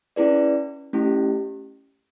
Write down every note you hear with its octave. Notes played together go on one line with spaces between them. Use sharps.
C#4 E4 G#4 B4 D5
A3 C#4 E4 G4